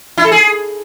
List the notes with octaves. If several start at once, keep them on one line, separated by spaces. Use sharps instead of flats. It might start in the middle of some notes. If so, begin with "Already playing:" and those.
E4
A4
G#4